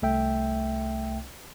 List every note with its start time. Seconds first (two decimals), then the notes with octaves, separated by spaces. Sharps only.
0.02 C2 A3 E5 G5